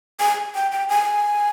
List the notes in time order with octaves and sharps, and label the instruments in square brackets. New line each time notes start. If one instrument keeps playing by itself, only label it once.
[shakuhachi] G#5
G5
G5
G#5